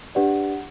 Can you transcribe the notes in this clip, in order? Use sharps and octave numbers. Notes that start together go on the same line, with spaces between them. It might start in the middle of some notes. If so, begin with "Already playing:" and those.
D4 G4 B4 D5 F#5